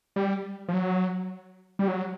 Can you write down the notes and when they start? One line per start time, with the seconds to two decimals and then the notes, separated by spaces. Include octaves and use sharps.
0.16 G3
0.68 F3
0.73 F#3
1.79 G3
1.88 F#3